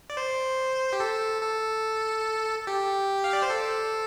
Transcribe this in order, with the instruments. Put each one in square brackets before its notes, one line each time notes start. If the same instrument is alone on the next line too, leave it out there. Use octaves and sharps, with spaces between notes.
[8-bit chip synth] D5
C5
G4
A4
A4
G4
F5
D5
C5
A4